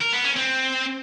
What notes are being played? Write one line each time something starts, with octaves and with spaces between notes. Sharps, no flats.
A#4
B3
C#4
C4